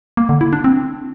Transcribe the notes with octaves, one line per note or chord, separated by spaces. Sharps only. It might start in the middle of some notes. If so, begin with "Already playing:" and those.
A#3
D3
E4
D4
C4